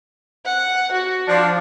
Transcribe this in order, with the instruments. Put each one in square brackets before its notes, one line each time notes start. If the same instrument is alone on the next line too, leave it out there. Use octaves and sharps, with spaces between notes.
[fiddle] F#5
F#4
[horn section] F3 D4